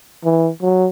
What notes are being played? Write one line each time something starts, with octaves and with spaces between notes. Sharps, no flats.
E3
F#3